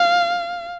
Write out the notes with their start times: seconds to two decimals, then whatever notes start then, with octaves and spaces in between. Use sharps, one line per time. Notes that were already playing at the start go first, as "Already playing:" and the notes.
Already playing: F5